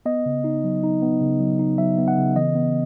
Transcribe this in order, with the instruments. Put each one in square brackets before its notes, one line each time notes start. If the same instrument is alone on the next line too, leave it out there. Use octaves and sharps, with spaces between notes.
[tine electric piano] B3 D#5
C#3
D#4
F#3
D#4
B3
C#3
F#3
D#4
F#3 E5
B3
F#5
C#3
E3 D#5
B3